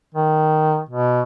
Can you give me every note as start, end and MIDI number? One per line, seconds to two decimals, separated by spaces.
0.15 0.78 51
0.89 1.22 47